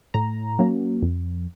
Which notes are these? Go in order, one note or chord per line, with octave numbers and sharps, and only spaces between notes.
A2 A#5
F#3 A#3 C#4
F2